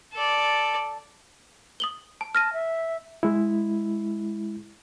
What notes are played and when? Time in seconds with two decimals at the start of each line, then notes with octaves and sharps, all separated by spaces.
0.13 A4 D5
1.80 D#6 F#7 G7
2.21 A5
2.35 A5 F6 A#6 D#7
2.53 E5
3.23 G#3 E4